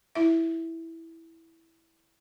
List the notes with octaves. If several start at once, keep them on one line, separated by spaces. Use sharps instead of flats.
E4 E5